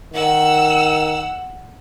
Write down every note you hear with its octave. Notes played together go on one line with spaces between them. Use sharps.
D#3 F#5 E6